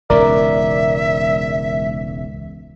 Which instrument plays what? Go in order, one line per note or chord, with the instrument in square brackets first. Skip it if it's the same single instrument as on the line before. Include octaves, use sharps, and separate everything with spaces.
[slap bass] E1 C#2 G#2 [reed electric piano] A#4 D5 [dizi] E5